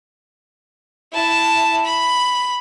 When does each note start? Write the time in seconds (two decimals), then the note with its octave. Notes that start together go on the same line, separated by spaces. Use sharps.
1.12 E4 A5
1.85 B5